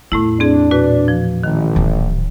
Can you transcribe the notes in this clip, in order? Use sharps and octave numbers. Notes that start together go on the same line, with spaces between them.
E2 A2 A3 E4
C4 D4 G#4
A#2 F#4 B4
F3
A1 D#3
D1